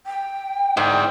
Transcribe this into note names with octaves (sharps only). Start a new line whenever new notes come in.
G5
G#2 E4 D5 F#5 G5